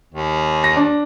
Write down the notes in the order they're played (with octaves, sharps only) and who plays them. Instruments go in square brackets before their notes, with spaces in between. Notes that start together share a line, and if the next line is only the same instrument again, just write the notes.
[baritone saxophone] D#2
[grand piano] A#6
D4